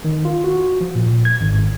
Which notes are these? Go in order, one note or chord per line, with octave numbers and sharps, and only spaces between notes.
D#3
F4
F#4
F3
A#2
G#6
G#1